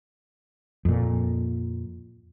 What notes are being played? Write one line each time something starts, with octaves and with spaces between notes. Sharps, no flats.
F2 A#2